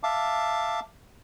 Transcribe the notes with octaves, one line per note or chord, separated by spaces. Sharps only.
E5 F5 A5 D6